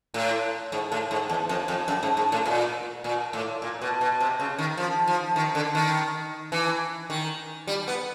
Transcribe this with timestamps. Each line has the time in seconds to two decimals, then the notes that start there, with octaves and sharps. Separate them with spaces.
0.14 A2
0.72 G#2
0.92 A2
1.11 G#2
1.29 E2
1.49 F2
1.68 F2
1.88 F#2
2.03 G#2
2.17 G#2
2.32 A2
2.45 A#2
3.04 A#2
3.33 A2
3.62 A#2
3.82 B2
4.01 B2
4.21 C3
4.40 C#3
4.58 D#3
4.77 F3
5.07 F3
5.36 D#3
5.55 D3
5.75 D#3
6.52 E3
7.10 D#3
7.67 G3
7.88 B3